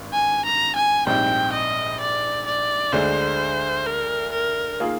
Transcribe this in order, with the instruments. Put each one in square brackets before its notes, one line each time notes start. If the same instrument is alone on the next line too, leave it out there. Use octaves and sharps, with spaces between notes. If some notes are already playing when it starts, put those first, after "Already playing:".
Already playing: [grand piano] G#1 G2
[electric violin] G#5
A#5
G#5
[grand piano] A#1 G#2 G3 C4 [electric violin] G5
[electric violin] D#5
D5
D5
[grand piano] D2 D3 G#3 D4 [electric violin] C5
[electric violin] A#4
A#4
[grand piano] D#3 A#3 F4 G#4